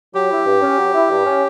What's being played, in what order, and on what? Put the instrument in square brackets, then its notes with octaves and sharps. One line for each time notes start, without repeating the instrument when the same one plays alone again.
[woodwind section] F#3 [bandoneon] G4
[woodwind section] E4
G2
C#4
F#3
E4
G2
C#4